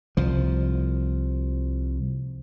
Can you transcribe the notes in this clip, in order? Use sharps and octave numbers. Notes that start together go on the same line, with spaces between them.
C2 F3